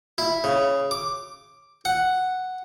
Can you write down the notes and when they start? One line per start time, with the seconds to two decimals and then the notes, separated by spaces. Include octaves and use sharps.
0.18 E4
0.44 C#3
0.91 D6
1.85 F#5